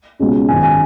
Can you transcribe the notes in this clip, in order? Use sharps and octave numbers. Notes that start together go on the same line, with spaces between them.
C#2 B2 G#3 C#4
G#1 F#2 D#3 F#3 G#5
G#5